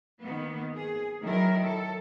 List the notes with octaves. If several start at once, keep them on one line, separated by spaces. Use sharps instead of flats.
D#3 A#3 B3
G#4
D#3 F#3 E4 A#4
A4